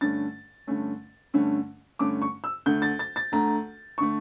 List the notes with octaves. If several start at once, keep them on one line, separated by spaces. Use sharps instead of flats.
G2 D3 A3 C#4 A6
G2 D3 A3 C#4
G2 D3 A3 C#4
G2 D3 A3 C#4 D6
C#6
E6
D2 D3 A3 G6
A6
A6
A6
D2 D3 A3 A#5
D3 A3 C#6